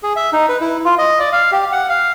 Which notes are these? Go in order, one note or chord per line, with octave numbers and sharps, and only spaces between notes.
G#4
E5
D#4
B4
E4
F4
D#5
D5
F5
G4
F#5
F5